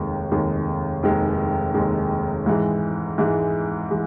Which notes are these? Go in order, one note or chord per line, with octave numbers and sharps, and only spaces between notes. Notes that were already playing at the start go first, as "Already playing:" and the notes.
Already playing: F1 D#2 D#3 G#3
F1 D#2 D#3 G#3
F1 D#2 D#3 G#3
F1 D#2 D#3 G#3
G#2 E3 G#3
G#2 E3 G#3
E3 G#3